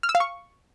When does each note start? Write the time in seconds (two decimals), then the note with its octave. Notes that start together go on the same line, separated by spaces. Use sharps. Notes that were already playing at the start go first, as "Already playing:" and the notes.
0.03 F6
0.09 E6
0.15 F5
0.20 C#6